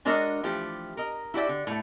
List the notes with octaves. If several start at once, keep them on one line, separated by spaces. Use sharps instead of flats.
G#3 D4 F#4 A#4 C#5 D#5
E3 F3 A3 G4
A#4 D#5
E4 F#4 G4 D5 E5
D3
A2 A3